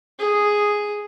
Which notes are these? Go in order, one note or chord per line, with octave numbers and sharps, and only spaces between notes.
G#4